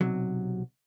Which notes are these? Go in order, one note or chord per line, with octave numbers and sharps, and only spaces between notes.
B1 C3 F#3